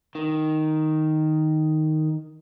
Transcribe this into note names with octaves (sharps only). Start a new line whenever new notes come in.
D#3